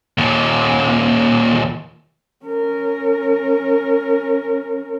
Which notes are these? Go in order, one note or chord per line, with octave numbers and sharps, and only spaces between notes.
D#2 A#2
C#4 A#4